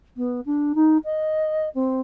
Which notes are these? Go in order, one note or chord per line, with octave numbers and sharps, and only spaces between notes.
B3
D4
D#4
D#5
C4